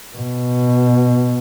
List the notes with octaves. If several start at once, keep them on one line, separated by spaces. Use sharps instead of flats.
B2